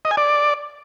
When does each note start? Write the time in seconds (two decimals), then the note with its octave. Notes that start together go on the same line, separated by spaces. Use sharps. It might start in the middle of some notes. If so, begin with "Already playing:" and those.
0.05 D#5
0.11 G#5
0.17 D5